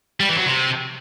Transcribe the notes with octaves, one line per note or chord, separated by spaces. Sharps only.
G3
E3
F#3
C3